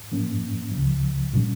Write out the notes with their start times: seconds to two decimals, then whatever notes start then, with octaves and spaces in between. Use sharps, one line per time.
0.11 A2 F3 A#3 C#4
0.71 C#2 C#3 F3
1.34 A#2 G3 C#4